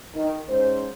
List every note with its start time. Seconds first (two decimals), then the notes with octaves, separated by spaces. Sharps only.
0.14 D#3
0.48 G#2 C#4 C5